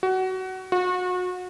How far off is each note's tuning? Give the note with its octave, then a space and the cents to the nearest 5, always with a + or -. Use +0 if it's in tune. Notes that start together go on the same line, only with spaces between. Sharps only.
F#4 +20
F#4 -35